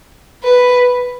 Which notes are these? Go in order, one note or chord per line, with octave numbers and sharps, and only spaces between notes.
B4